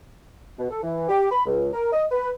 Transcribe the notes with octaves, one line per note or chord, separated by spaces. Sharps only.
B2
A4
E3
G4
B5
C#2
A#4
D#5
B4